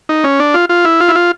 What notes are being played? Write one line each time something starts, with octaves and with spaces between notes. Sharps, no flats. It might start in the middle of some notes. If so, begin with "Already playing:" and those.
D#4
C#4
D4
F4
F4
E4
F4
E4
F4